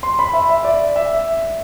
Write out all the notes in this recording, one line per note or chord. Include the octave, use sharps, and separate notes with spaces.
C6
B5
E5
E5
D5
E5